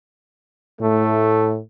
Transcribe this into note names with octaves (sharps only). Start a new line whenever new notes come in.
A2 A3